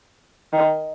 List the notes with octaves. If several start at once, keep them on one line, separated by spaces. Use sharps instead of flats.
D#3